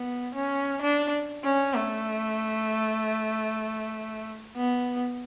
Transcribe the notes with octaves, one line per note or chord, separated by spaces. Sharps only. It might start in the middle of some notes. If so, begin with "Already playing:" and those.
Already playing: B3
C#4
D4
C#4
A3
B3